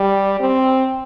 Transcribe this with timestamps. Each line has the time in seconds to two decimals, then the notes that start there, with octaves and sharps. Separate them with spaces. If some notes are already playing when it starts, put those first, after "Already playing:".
Already playing: G3
0.40 C4